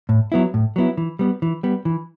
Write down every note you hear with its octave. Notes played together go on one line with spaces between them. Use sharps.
A2
F#3 B3 E4
A2
F#3 B3 E4
E3
G3 B3
E3
G3 B3
E3